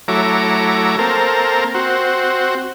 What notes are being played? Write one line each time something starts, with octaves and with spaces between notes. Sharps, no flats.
F#3 A3 E4 C#5 A#5 D6
A#3 C4 A4 A#4
C4 F#4